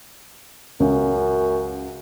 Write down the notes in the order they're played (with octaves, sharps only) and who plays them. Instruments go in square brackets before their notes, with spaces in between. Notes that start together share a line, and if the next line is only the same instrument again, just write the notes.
[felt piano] C#2 [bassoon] F#2